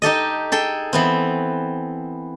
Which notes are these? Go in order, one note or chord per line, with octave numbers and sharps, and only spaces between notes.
D#4 G4 A4 D#5
G#4 A4 G5
E3 B3 C4